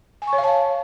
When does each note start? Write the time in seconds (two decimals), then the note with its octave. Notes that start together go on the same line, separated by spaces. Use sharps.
0.22 G#5
0.27 C#6
0.33 C#5
0.38 F5
0.44 A5